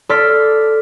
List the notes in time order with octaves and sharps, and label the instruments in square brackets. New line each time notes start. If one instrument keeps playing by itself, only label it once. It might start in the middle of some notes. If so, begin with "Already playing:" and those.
[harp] A4 D5 C6 F6 B6